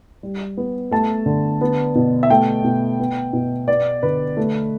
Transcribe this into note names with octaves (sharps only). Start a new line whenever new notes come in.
G3
B3
A3 A5
D3
B3
B2
E5
A3 G5
B2
B3
B2
B3 D5
D3 B4
A3